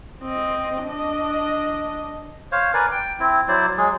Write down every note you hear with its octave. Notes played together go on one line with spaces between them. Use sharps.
C4 D#5
D4 D#5
C5 C#5 F5
A#4 B4 D5 G#5
G5
C4 E4
F#3 E4 C5 D5
F#3 G#3 G#4